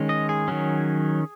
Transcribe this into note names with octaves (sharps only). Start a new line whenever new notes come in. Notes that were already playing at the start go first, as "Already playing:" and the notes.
Already playing: D#3 G#3 C#4
D#5
G#4
D#3 F#3 C#4